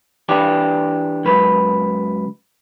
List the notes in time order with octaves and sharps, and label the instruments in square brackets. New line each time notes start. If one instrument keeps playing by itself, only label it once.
[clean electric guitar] E3 D4 G4
C#2 F#2 B4